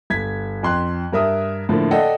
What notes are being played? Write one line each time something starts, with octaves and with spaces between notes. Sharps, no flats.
G1 G#6 B6
F2 C6 F#6
G2 A#4 E5 D#6
A2 D3 F3 A#3
A4 D5 D#5 F#5 G5